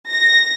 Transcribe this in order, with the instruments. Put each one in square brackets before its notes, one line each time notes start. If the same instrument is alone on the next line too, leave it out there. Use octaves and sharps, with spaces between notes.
[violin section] A#6